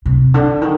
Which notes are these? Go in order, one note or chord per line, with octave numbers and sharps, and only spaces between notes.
C3
D3
D#3